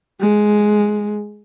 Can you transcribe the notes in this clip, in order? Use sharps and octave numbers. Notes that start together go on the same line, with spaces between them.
G#3